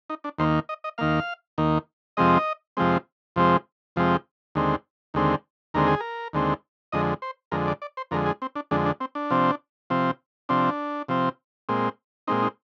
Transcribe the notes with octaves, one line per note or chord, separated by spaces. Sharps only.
D#4
D4
D#2 D#3 A#3 C5
D#5
D#5
D#2 D#3 A#3 F5
D#2 D#3 A#3
F2 C3 F3 G#3 C4 D#5
F2 C3 F3 G#3 C4
F2 C3 F3 G#3 C4
F2 C3 F3 G#3 C4
D#2 D3 G#3 C4
D#2 D3 G#3 C4
D#2 D3 G#3 C4 A#4
G#4
A#4
D#2 D3 G#3 C4
F2 D3 G#3 D#5
C5
F2 D3 G#3 A#4
D5
D5
C5
F2 D3 G#3 A#4
G#4
C4
D4
F2 D3 G#3 D4
D4
C4
D4
C3 F3 C4
C3 F3 C4
C3 F3 C4 D4
C3 F3 C4
A#2 G#3 C4
A#2 G#3 C4 D#4
D#4